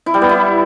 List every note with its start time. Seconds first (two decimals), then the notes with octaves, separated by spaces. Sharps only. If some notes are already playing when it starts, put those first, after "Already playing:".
0.06 E4
0.14 G3
0.22 B3
0.29 E4